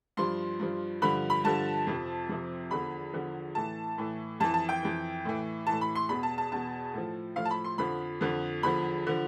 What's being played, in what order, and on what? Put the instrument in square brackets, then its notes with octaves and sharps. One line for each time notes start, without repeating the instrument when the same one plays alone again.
[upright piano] G2 F3 C6
G2 F3
G2 D3 F3 B5
B5
G2 D3 F3 A5
F2 C3 F3
F2 C3 F3
E2 D3 F3 B5
E2 D3 F3
A2 E3 A5
A2 E3
F2 E3 A5
A5
G5
F2 E3
A2 E3
A2 E3 A5
B5
C6
E2 B2 B5
A5
A5
E2 B2 A5
A2 F3
A2 F3 F5
A5
B5
C6
F2 D3 F3 B5
F2 D3 F3
E2 D3 F3 B5
D3 F3